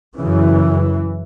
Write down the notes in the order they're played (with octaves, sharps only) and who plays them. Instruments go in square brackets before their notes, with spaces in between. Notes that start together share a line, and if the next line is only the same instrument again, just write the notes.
[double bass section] F#2 C#3 E3